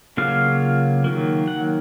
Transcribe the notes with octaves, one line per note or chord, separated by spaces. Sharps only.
C#3 F#3 A#3 F4 F5
D#3 F#3 A#3
F#5